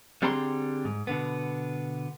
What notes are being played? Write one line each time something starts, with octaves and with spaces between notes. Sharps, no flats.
D3 G3 C4 G#4 A#5 C6
G#2
B2 D3 B3